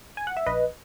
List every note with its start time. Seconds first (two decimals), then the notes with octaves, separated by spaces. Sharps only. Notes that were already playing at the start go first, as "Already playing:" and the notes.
0.17 G#5
0.27 F#5
0.37 E5
0.46 A#1 B4 D#5